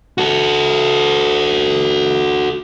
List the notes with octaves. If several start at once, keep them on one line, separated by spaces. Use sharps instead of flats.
F#4 A4